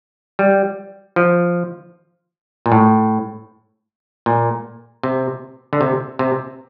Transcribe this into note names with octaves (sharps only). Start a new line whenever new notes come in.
G3
F3
A#2
A2
A#2
C3
D3
C3
C3